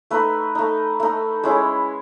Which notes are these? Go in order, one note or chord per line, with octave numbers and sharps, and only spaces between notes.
A3 D#4 B4
A3 D#4
A3 D#4
G#3 C#4 E4